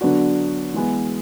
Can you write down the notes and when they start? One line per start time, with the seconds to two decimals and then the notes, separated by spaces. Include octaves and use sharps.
0.01 D3 F#3 B3 D4 F#4
0.74 E3 G#3 B3